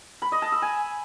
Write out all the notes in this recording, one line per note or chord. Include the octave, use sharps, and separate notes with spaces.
B5
D#5
A5
E6
G#5